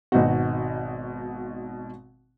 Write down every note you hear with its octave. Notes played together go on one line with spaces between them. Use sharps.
G#1 B2 D#4 F#4